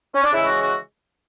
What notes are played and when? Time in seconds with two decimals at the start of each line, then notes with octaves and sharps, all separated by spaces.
0.14 C#4
0.24 D4
0.32 C#3 E3 G#3 E4
0.45 F#4
0.59 F#4